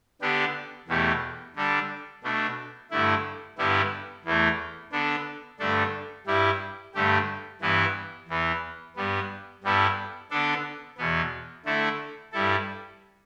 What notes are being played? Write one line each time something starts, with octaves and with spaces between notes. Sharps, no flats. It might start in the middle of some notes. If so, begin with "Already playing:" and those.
D3 B3 D4 G4
E2 B2 A3 G4
D3 G3 D4 A4
B2 A3 D4
G2 D3 A3 E4
G2 D3 G3 B3 E4
E2 E3 A3
D3 B3 D4 A4
G2 D3 A3 D4 A4
G2 G3 E4 G4
G2 D3 A3 G4
G2 E3 B3 E4
E2 E3 B3
G2 G3 B3
G2 G3 B3 E4 A4
D3 B3 D4 A4
E2 B2 B3
D3 A3 E4 A4
G2 G3 E4 A4